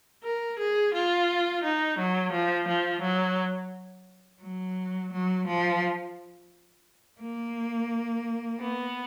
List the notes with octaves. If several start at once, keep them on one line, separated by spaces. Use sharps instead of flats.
A#4
G#4
F4
D#4
F#3
F3
F3
F#3
F#3
F#3
F3
A#3
B3